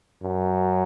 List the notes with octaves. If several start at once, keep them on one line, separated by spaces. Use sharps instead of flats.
F#2